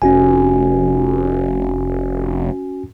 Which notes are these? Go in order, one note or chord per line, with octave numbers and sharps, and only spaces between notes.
F1 C#4 F#4 G#5